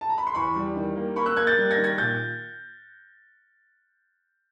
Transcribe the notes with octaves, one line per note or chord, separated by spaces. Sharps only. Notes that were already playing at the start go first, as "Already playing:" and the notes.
A5
A#5
B5
C6
E2 B5 C#6
G3
D#3
A#3
A#3 B5 C#6
E6 F#6
A#3 F#6 G#6
G6 A6
G3
G#6 A#6
D#3
G#6 A#6
A#2 G6 A6